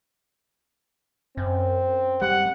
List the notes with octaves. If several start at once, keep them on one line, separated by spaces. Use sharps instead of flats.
F#2 C4
G3 F#5